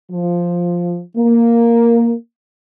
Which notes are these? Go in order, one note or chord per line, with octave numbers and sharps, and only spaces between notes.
F3
A#3